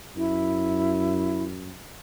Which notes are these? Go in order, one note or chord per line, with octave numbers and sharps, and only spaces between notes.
F#2 E4